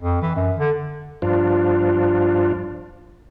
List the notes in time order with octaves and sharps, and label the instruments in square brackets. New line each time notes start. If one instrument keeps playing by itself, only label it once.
[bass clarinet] F2
E3
F#2
D3
[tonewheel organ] G2 F3 D4 F4